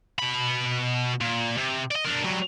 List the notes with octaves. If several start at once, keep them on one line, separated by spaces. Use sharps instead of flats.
B2 B5
A#2
C3
D5 D#5
D4 A#4
F#3 G3